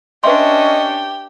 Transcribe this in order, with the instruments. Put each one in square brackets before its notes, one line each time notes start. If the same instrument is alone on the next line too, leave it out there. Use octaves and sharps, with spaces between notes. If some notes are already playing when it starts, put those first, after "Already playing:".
[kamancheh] C#4 D4 [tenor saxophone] G4 [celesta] B4 E5 C6 [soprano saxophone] D#5